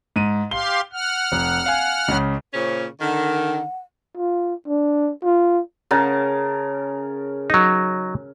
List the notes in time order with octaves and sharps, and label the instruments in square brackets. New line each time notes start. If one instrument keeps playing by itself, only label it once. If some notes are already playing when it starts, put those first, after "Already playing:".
[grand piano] G#2 D#7
[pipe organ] G4 F5 C6 [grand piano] G7
[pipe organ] F#5 F6
[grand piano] F1
F5 G#5
C#2 C#3
[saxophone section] A#2 C#3 C#4 [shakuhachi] C5
[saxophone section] D3 D#3 [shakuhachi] F#5
[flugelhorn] F4
D4
F4
[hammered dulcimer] C#3 A#4 A5
[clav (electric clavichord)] F#3 D#4